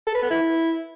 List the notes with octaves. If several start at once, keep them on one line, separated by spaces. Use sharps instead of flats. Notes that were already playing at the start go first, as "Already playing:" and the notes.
A4
B4
B3
E4